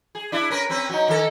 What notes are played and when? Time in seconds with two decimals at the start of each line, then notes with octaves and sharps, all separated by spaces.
0.15 G#4
0.32 D4 E4
0.50 C#4 A#4 B4
0.70 C4 C#4 B4
0.89 F#3 D#4
1.08 D#3 A4